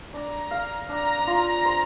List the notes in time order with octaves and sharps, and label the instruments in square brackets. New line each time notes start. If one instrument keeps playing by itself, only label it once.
[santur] D4 [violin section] A#5
[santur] F5
[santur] D4 [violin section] A#5
[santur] F4
C5